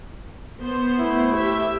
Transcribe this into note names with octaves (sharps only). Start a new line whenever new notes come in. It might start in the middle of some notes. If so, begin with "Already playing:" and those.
B3 C5
A3 E4
G4 E5